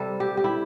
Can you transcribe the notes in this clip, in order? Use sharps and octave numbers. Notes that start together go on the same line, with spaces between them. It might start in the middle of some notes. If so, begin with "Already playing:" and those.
Already playing: C3 G3 A4
G4
G4
E4